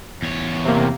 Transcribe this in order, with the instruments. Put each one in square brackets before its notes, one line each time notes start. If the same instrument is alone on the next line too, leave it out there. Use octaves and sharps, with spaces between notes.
[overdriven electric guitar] E2 C#5
[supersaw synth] C3 A#3